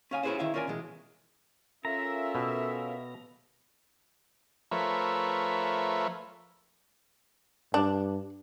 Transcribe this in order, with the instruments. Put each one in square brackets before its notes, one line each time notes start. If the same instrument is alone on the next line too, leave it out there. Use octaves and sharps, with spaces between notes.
[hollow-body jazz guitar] C#4 F5 G#5
C#4 E4 F#4 G#4 B4 C5
D#3 E4 E5 F5
C#4 F4 A#4 D5 G#5
B2 E3 G#3
[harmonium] C#4 F4 A#4 [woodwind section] A4 E5 [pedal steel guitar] A#5
[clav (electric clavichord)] B2
[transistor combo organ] F3 A3 A#4 B4 C#5 E5
[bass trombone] G2 [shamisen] D4